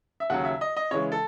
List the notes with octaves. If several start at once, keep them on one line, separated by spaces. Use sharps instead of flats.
E5
D#2 C#3 F#3 F#5
E5
D#5
D#5
C#3 E3 G#3 C#5
A4